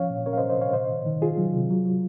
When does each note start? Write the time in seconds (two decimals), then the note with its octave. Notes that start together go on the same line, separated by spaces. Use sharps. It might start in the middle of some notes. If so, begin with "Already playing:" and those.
Already playing: F3 C#4 C#5 F5
0.10 A#2
0.26 C#4 A#4 C#5
0.33 F5
0.38 C5 D#5
0.42 C#4
0.50 C5 D#5
0.57 A#2 C#5 F5
0.73 C3 C5 D#5
0.90 D#3
1.06 D#3
1.21 D#3 F4 G#4
1.37 F#3
1.54 C3
1.70 F#3
1.85 F#3